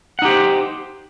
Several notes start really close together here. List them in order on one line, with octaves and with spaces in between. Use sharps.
F#5 D#4 G4 C5